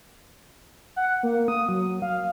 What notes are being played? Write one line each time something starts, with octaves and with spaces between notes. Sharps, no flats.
F#5
A#3
D#6
F#3
F5